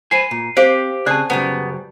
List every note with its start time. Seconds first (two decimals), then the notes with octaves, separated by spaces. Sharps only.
0.11 B4 C5 G#5 C7 D#7
0.31 A#2
0.57 C4 G4 C5 F5
1.06 C#3 C4 G#4 D5 A5 F#6
1.30 F#2 C#3 G3 B3 C5